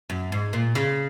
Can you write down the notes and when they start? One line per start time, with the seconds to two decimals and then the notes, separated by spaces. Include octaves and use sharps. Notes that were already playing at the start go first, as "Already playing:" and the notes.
0.10 F#2
0.32 G#2
0.53 A#2
0.75 C#3